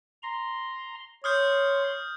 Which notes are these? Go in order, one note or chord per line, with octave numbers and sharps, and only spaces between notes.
A#5 C6
C#5 C6 D#6 F6 G6